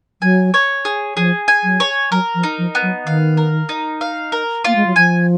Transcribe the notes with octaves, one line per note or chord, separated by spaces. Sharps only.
F#3 G#5
C#5
G#4
F3 G#4
G#5
F#3
C#5
F#3 A#4
F3
D#4
F3
B3
F#3
D#3 F5
A#4
D#4
F5
A#4
A#3 F4
G#3
F#3
F3 G#5